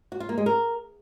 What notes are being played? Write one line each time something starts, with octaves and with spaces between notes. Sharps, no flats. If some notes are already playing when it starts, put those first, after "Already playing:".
F#4
F4
A#3
G#3
A#4